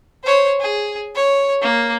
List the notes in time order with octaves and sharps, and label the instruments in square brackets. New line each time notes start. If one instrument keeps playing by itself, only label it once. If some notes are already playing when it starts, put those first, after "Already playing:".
[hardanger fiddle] C5 C#5
G#4
C#5
A#3